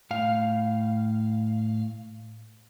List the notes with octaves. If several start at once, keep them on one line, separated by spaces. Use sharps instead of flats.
A2 F5